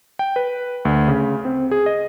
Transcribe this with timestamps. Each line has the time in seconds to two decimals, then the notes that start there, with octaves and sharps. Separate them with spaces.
0.19 G5
0.36 B4
0.85 D2
1.08 C#3
1.45 C4
1.71 G#4
1.86 D#5